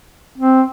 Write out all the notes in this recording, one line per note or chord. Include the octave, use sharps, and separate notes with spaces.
C4